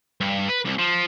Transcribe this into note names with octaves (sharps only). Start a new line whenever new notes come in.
G2
B4
C2
F3